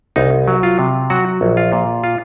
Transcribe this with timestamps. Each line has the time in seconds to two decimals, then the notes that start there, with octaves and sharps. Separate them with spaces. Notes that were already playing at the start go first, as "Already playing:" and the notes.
0.16 C2 D#4
0.48 F#3
0.63 F4
0.79 C3
1.10 F#3 F#4
1.41 A#1
1.57 F4
1.72 A#2
2.04 F4